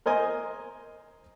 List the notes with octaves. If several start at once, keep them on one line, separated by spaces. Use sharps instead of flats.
A#4 C5 D#5 G#5